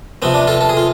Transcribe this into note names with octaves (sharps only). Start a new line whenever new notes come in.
C3 F3 B3 C4
D4
F4 A4
A4
G#4
F4